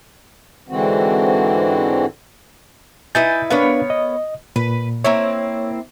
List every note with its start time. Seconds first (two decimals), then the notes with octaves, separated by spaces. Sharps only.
0.69 G#2 D3 E3 C4 F#4
3.15 D#4 E4 B4 G#5 G6 A6
3.50 B3 D4 A#4 B4 C#5 F5
3.90 D#5
4.56 A#2 B4
5.04 A#3 C4 E4 C#5